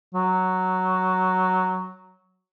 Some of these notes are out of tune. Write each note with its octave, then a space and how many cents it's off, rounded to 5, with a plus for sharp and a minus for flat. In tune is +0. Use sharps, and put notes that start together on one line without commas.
F#3 +0